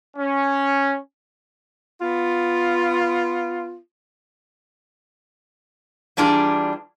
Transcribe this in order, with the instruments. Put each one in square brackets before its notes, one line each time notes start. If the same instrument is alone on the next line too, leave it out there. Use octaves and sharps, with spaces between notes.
[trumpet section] C#4
[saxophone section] B3 F4
[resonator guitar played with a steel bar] E3 G3 D4 F4 G#4 A#5